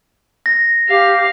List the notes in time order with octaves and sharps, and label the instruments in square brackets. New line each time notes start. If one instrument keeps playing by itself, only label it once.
[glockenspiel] A#6
[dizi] G4 [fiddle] F5